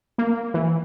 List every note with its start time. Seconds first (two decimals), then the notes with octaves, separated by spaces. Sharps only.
0.18 A#3
0.54 E3